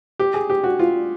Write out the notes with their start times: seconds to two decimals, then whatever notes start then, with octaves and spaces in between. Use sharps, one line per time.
0.19 G4
0.34 G#4
0.50 G4
0.64 F#4
0.79 F4